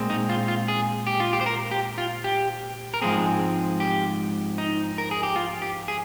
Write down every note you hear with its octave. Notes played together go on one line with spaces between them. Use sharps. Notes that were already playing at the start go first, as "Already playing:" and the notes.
Already playing: A#2 G#3 C4
D#4
F4
F4
G#4
G4
F4
G4
C5
A#4
G4
F4
G4
A#4
G#2 F3 G#3 C4 G#4
G4
D#4
A#4
G#4
G4
F4
G4
G#4